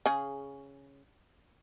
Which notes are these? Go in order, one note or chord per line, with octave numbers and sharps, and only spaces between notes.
C#3 G#4